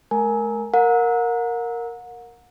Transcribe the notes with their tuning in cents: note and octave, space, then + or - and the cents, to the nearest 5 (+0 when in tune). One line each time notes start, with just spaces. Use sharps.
A3 -45 A#4 +0 G#5 +15
A#4 +0 F#5 -35